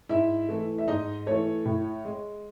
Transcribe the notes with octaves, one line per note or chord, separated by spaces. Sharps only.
G#2 E4 E5
E3 A3
E5
G#2 D#4 D#5
E3 A3 C#5
A2
G#3